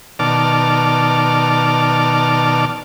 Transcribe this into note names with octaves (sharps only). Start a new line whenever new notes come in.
B2 D#3 D5 A5 D6 F6